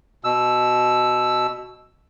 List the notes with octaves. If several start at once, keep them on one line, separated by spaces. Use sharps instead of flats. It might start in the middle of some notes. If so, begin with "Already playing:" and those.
B2 E6